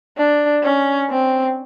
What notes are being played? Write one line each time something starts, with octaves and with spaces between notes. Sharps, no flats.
D4
C#4
C4